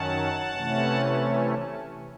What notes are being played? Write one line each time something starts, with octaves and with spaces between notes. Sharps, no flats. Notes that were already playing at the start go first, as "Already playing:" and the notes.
Already playing: F#2 D#3 F#3 C#4 F#5 A5
C3 E3 A3 C#4